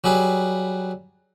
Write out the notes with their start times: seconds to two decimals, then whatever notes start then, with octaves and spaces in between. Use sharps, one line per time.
0.04 F#3 G3 G#4 B4